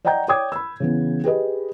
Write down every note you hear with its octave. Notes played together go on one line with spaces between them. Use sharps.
D5 D#5 F#5 G5 A#5 G6
C#5 D5 G5 D6 D#6 G#6
B5 E6
C#3 E3 B3
G4 G#4 B4 D#5